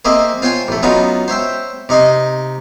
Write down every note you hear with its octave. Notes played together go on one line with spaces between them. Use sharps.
A#3 C4 G#4 D#5 E5
F4 C5 C#5 G5 G#5 C6
A1 A3
F#3 B3 C#4 D#4 F4 F#4
C5 C#5 E5 G5
C3 D#4 D#5 C6